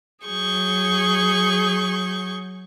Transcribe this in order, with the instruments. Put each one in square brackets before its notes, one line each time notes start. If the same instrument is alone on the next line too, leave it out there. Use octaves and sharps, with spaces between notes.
[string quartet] F#3 G#4 C#6 G6